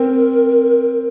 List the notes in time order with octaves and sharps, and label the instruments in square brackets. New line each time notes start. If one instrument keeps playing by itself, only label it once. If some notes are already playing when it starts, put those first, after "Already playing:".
Already playing: [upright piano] C4 [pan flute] A#4